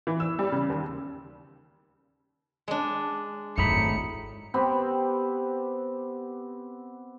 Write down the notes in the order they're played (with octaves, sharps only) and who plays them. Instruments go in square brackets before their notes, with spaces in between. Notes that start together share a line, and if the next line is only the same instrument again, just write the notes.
[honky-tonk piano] E3
E6
G3
C#3
D#2
[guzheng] G#3 D4
[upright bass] D1 G#1 [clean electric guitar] A2 D#4 B5 [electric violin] C#7
[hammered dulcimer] B3 C4 G4 B5